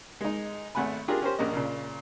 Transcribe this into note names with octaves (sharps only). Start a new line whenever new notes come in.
G#3 D#4
G#1 A3 F#5 G#5 B5
D4 F4 G4 G#4 A#4
C#4 G4 A#4 C5
A#1 F#2 A#3 D#5
A#2 C#3